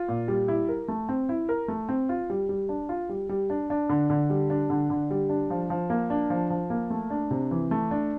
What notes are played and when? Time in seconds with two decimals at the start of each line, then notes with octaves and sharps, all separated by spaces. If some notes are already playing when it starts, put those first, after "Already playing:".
Already playing: F4
0.08 A#2
0.28 G3
0.48 E4
0.69 A#4
0.88 A3
1.09 C4
1.29 E4
1.49 A#4
1.68 A3
1.89 C4
2.09 F4
2.30 G3
2.49 G3
2.69 D4
2.89 F4
3.09 G3
3.29 G3
3.50 D4
3.70 D4
3.89 D3
4.10 D3
4.30 G3
4.50 D4
4.70 D3
4.90 D3
5.11 G3
5.29 D4
5.50 F3
5.70 F3
5.90 A#3
6.10 D4
6.30 F3
6.50 F3
6.70 A#3
6.90 A3
7.10 D4
7.31 C3
7.51 E3
7.71 A3
7.91 D4